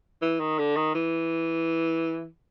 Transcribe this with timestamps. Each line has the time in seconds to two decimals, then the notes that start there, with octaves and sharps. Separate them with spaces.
0.22 E3
0.40 D#3
0.59 D3
0.76 D#3
0.94 E3